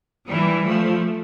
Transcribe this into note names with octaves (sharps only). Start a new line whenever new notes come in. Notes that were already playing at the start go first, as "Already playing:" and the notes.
E3 G3
F3 A3